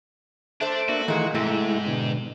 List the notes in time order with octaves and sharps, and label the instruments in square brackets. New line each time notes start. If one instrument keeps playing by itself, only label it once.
[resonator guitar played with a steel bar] A3 C5 [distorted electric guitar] D4
[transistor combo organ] A#3 D4 E5 [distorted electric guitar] F#4
[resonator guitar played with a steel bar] A#2 G#3 [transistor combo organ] D#3 E3 A3
[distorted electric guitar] G#2 [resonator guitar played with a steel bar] C3 [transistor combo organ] G#3 A3 E4
[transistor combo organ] B2 D3